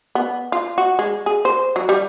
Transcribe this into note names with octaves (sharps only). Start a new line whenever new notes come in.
B3
F4
F#4
G#3
G#4
C5
F#3
G3